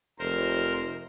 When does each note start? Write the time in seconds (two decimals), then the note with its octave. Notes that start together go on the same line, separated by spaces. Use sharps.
0.19 F1 A#4 C5